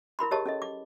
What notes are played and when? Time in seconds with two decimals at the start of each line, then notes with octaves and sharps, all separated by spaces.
0.19 E4 A#4 B5 C6
0.31 G4 G#4 A#4 C#5 D#5 A5
0.46 C#4 A4 D#5
0.62 D6